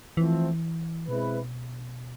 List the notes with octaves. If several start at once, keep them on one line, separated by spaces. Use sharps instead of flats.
E3 F3 A3 C4
B2 G#3 C4 E4 B4